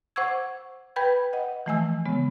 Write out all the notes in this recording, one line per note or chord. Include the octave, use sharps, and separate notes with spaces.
C5 F#5 C#6 D6 E6 G#6
B4 G5 B5 G6 G#6
D#5 F#5
E3 F3 A3 D#5 G#5 E6
C#3 G#3 B3